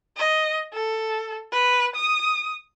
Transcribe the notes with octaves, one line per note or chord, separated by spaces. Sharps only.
D#5
A4
B4
D#6